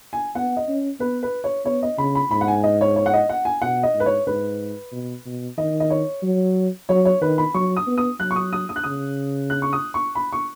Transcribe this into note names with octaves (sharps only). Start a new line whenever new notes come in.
G#5
B3 F#5
D#5
C#4
B3 B4
B4
C#5
B3 C#5
D#5
C#3 B5
B5
G#2 B5
F#5
G#5
D#5
C#5
C#5
F#5
D#5
F#5
G#5
B2 F#5
D#5
G#2
B4
C#5
G#2 B4
B2
B2
D#3 D#5
D#5
C#5
F#3
F#3 C#5
C#5
D#3 B4
B5
F#3 C#6
D#6
B3
D#6
F#3 F#6
C#6
D#6
D#6
D#6
F#6
C#3 D#6
F#6
C#6
D#6
C#6
B5
C#6